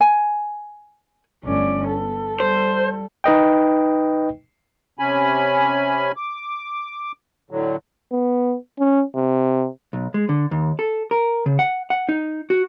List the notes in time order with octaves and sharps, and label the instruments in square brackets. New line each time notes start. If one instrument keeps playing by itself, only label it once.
[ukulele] G#5
[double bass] G1 A3 [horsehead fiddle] C#4 D5
[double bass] B3 [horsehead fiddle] A4
[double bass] G3 [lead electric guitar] C5
[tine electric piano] D#4 B4 D#5 G5
[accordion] C3 C#4 G#5 B5
D6
A2 D3 F#3
[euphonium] B3
C#4
C3
[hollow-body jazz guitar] B1
G#3
D3
D#2
A4
A#4
C#3
F#5
F#5
D#4
F#4